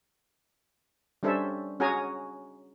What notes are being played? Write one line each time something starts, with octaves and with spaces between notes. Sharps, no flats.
G3 C#4 D4 A4 C5 E5
C#4 F#4 G#4 G#5 A#5